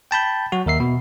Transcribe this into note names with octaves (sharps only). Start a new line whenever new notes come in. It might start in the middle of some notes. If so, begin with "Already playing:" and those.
G5 A5 B5 G6
F#3 F#4
D#2 A#4 E5 C7
B2